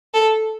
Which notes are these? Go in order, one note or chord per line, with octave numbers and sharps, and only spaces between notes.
A4